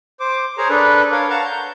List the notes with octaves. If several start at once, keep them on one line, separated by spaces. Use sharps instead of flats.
C5 D6
G#4 A#4 C5 C#5 A#5
D4 A4 B4
A#4 C#5 F5
F5 F#5 A5 A#5 C#6
G6